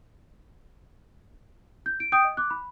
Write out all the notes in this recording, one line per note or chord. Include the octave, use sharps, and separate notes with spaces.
G6
D7
G5 D#6 G6 D7
D#5
D6 F#6
B5